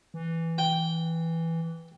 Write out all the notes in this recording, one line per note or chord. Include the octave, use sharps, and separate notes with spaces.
E3
G5